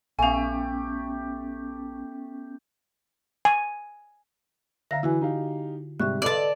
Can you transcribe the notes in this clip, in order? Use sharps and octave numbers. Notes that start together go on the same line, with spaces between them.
A#1 A3 B3 C#4 G4 F5 G#5
G#5
D3 E5 F5 A#5 A#6
E3 E4 F#4 G#5
D#4 G4 F5
G#2 C3 G3 E5 C#6 F#6
A4 B4 D5 D#5 A5